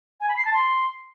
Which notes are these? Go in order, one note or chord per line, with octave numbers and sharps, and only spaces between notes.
G#5
B5
C7
A5
C6